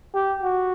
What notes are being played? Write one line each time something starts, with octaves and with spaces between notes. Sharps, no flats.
G4
F#4